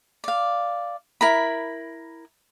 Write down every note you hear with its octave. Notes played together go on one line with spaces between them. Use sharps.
D5 F5
E4 A#4 B5